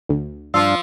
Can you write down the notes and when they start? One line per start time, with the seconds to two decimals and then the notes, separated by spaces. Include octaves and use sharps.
0.09 D2
0.54 G2 F3 D4 F4 F5 E6